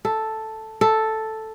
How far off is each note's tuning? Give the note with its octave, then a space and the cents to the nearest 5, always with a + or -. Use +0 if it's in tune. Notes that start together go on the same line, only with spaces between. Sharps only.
A4 +0
A4 +0